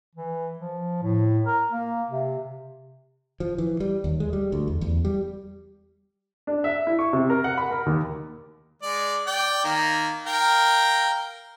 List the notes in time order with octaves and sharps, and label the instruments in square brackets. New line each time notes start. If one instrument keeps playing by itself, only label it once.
[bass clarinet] E3
F3
A2
A#4
A#3
C3
[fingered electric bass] F3
E3
G3
D#2
G#3
G3
D2
E2
E2
G3
[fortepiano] D4
E5
E4
C#6
C3
A#4
F#5
B5
A#4
D#2
[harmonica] G#3 D5
D5 G5
D#3 A#3
A#4 F5 G5